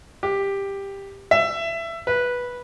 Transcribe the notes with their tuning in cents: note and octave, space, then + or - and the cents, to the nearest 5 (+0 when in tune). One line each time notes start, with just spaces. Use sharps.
G4 +10
E5 +20
B4 -10